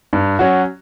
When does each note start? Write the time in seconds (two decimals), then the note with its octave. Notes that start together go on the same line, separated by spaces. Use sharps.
0.13 G2
0.39 F#3 C#4 F#4